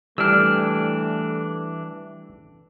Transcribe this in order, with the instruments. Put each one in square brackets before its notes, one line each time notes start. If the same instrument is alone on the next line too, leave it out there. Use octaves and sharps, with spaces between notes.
[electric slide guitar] E3 D4 [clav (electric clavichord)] G3 [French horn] A3 [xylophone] E6 F6